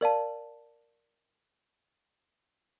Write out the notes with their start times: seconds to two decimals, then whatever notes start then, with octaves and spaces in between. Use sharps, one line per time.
0.01 A#4 D5 F5 A5